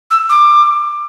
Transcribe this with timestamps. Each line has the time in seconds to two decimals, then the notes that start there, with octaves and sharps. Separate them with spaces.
0.11 E6
0.29 D6